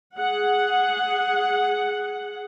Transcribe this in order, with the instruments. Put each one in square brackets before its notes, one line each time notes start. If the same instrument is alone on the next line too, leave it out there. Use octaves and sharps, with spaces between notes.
[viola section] G#4 F#5